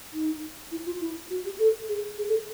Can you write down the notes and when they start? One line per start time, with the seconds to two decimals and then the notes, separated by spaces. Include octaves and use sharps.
0.13 D#4
0.71 E4
0.86 F4
1.00 E4
1.30 F#4
1.45 G4
1.59 A4
1.89 G#4
2.18 G#4
2.28 A4